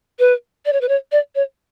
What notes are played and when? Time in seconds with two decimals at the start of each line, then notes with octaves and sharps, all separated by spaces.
0.19 B4
0.65 D5
0.73 C#5
0.81 B4
0.88 C#5
1.12 D5
1.35 C#5